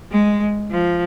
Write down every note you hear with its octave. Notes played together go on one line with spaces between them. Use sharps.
G#3
F3